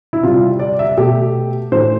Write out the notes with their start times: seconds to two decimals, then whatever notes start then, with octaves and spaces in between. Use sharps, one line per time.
0.13 E4
0.23 C3 G3 F4
0.60 D5
0.79 E5
0.97 B2 A3 G4
1.72 A2 E3 A3 C5